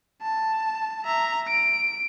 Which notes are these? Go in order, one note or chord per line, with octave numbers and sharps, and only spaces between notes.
A5
E5 A#5
D7